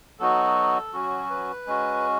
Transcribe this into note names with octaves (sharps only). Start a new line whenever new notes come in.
F#3 B3 D#4 F#4 A4
F#3 C#4 F#4
B4
G#3 C#4 F#4